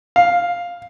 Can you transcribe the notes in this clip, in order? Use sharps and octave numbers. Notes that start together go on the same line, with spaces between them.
F5